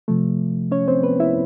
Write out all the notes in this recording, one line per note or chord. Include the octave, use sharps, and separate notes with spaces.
C3 F3 A3
C#4 C#5
C4 C5
B3 B4
E4 E5